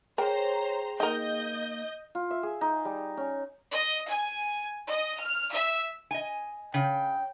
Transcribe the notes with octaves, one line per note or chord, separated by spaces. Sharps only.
G#4 A#4 C5 C#5 G5 A#5
A#3 D#4 A#4 D#5 G6
F4
E5
G#4
D#4
G3
C#4
D#5
G#5
D#5
F6
E5
D#5 G#5
C#3 G5